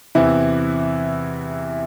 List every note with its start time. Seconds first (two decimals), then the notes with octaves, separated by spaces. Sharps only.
0.15 E2 C3 E3 E4